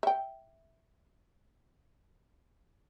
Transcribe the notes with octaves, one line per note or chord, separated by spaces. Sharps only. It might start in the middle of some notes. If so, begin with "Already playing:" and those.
E5 G5